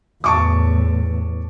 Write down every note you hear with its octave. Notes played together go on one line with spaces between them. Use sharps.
E2 A2 A5 C#6 D6